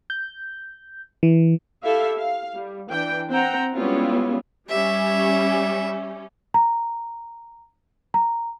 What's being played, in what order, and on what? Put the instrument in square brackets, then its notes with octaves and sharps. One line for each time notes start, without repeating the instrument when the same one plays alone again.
[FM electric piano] G6
E3
[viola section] E4 G4 A4 E5 F5
F5
G3
E3 D4 G5
C4 C5 F#5 G5 A#5
G3 G#3 B3 C#4 E4 F4
[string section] G3 C#4 [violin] E5
[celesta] A#5
A#5